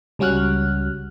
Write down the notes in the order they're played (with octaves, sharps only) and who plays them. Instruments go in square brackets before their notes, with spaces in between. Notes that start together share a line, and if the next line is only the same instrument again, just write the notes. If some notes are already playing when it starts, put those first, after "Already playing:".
[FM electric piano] C#2 G3 C#4 F#4 F6 F#6